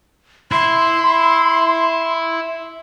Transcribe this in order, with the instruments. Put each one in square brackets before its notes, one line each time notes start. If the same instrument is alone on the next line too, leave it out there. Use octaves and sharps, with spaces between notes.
[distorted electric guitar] E4 [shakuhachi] C6